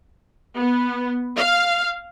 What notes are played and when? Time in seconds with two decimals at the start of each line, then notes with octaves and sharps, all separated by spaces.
0.55 B3
1.37 F5